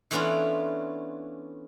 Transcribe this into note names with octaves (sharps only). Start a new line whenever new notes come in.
E3 A3 B3 C#4 D4 F4